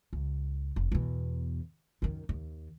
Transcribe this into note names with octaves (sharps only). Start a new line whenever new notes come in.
C#2
F1
E2 B2
F#2 D#3
D#2